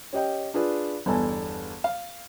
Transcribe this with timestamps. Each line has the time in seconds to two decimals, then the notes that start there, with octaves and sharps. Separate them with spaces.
0.13 C#4 G4 D#5 G5
0.54 D4 F4 G#4 B4
1.06 G1 E2 A4 G#5 A5
1.84 F5